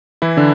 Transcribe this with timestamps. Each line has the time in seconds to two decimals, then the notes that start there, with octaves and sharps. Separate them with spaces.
0.22 E3 E4
0.37 D3 D4